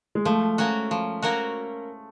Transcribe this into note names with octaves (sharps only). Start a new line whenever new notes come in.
G#3
F3 A3
A#3 C#4 F#4 A#4
F3
A#3 C#4 F#4 A#4